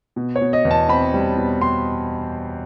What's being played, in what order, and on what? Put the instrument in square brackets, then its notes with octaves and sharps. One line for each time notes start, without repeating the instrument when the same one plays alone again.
[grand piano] B2
C#5
B2
D#5
E2
A5
C4 B5
G3
B2
G3 C6